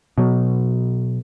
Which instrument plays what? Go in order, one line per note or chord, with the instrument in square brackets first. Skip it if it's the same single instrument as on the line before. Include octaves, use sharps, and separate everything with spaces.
[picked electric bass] B2 F#3